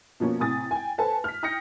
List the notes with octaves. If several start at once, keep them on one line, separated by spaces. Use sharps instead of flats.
B2 F3 A#3 C#4
A2 C3 G#5 D#6 A6
G5 G#5
A4 B4 C5 G#5 A5
F6 B6
G5 D#6 F6 G6 A#6 C#7